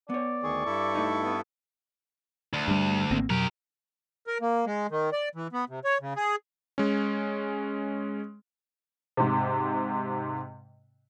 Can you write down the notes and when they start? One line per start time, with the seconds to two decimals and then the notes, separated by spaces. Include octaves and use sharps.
0.10 B3 C#5 D5
0.43 D2 D#3 G#4 C#6
0.65 G2 E4 A4
0.95 A3 D#4
1.22 B3
2.53 D2
2.68 G2 G3
3.11 G#1 A#3 C4
3.30 F2 B2 F#3 G4 A#4
4.27 A#4
4.41 A#3
4.66 G#3
4.91 D#3
5.13 D5
5.35 E3
5.53 B3
5.69 C3
5.84 C#5
6.01 C#3
6.16 G#4
6.78 G#3 C#4
9.17 G#2 C3